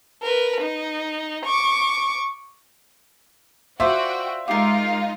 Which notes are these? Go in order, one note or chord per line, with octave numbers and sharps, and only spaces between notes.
A#4 B4
D#4
C#6 D6
F4 F#4 C5 D5 E5 G5
G#3 D#4 F4 G4 A#4 F5